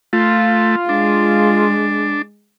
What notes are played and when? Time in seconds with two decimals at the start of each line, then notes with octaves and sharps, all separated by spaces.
0.13 A3 F4
0.89 G#3 D4